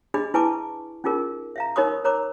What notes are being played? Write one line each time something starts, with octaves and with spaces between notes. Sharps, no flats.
D4 G#4 D#5 B5
E4 B4 G#5 A5 C#6 D6
C#4 D#4 F4 G#4 A#4
E5 F5 A#5
D#4 A#4 C#5 B5 C#6 D#6
A#4 C#5 A#5 B5 D6